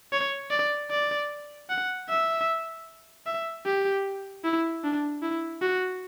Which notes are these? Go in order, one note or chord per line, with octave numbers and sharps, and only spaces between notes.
C#5
D5
D5
F#5
E5
E5
G4
E4
D4
E4
F#4